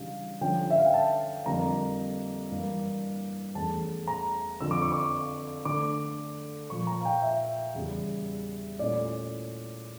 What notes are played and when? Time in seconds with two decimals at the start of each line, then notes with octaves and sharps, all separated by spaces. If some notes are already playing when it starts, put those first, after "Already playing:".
Already playing: C#3 E3 G3 D4 F5
0.41 D3 F3 C#4 G5
0.70 E5
0.78 F5
0.86 G5
0.94 A5
1.46 F2 D3 G3 A#3 A#5
2.51 G2 E3 A#3 D4
3.55 E2 E3 A3 C#4 A5
4.08 A#5
4.60 F2 D3 F3 E6
4.71 D6
4.82 C#6
4.92 D6
5.65 D3 A3 D4 D6
6.70 A#2 F3 A#3 C#6
6.87 A#5
7.01 F5
7.05 G5
7.22 E5
7.75 E2 C#3 G3
8.79 A#2 A3 C#4 E4 D5